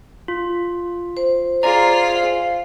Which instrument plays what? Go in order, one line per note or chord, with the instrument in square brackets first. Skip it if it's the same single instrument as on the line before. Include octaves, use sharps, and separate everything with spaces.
[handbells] F4
[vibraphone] C5
[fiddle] F4 G#4 [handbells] D5 A#5
[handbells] F5